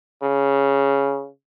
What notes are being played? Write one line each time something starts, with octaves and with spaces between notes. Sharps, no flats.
C#3